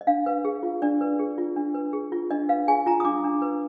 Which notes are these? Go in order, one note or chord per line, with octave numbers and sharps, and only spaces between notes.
D#5
D4 F5
B4
G#4
F4
D4 D5
B4
G#4
F4
D4
B4
G#4
F4
D4 D#5
B4 F5
G#4 G#5
F4 A#5
D#6
D4 D6
D4
B4